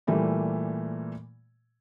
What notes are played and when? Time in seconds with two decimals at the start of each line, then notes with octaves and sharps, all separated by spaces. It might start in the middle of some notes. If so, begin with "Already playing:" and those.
0.07 A#2 E3 G3 A3 A#3